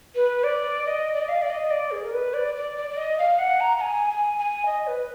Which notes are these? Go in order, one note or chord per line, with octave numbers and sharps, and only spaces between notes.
B4
D5
D#5
D5
D#5
F5
D5
D#5
D5
G#4
A#4
B4
D5
D5
D5
D5
D#5
F5
F#5
A#5
A#5
G#5
G#5
G#5
D#5
B4